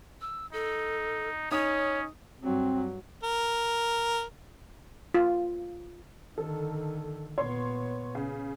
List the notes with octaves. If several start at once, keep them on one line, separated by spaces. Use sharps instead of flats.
E6
D#4 A4
C#4 D#4 C#5 D#6
G2 F#3 C4
A#4
F4
D3 D#3 A4
A#2 B3 C#5 C6
C#3